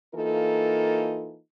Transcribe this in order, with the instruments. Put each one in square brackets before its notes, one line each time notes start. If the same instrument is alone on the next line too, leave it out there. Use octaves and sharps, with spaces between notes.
[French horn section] E3 A#3 D#4 F4 A4